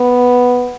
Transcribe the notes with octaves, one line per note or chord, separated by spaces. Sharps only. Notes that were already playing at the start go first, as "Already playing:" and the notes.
Already playing: B3